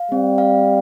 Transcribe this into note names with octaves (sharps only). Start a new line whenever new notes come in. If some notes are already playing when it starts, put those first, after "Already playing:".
Already playing: F5
G3 C4
F5
C4